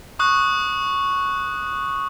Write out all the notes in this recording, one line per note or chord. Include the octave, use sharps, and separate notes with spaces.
C#6 D#6 F#6